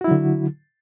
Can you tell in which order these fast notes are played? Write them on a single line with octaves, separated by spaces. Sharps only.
F#4 E4 F#3 D3